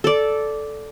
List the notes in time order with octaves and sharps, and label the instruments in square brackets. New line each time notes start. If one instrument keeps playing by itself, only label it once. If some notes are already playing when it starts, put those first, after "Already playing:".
[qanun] A4 D5